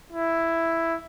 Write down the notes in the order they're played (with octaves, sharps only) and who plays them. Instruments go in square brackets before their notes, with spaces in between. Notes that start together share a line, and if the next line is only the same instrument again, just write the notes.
[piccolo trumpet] E4